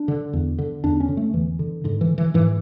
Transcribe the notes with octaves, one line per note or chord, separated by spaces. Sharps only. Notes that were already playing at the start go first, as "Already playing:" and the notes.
Already playing: D4
D3
E2
D3
E2 D4
C#4
D3
A3
E2 E3
D3
G#2 D3
E3
E3
G#2 E3